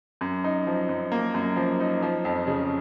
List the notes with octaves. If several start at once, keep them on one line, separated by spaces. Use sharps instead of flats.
F#2
D#4
F3
F#2
A#3
F#2
F3
D#4
F3
F2
C#3